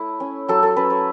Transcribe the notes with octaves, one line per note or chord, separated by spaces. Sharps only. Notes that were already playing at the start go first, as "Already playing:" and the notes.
Already playing: A3 E4 C#5
C#4
F#3 A4
A4
C#4 B4
C#5